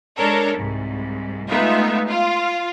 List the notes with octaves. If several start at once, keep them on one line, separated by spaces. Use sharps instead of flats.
G#3 D4 A4 A#4 C#5
C2 G#2
G#3 A3 B3 D#4 F4 E5
F4